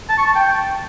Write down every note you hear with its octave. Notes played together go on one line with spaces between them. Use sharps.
A5
C#6
A5
G5